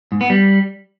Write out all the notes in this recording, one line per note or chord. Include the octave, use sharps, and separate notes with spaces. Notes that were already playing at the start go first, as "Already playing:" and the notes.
G#2
B3
G3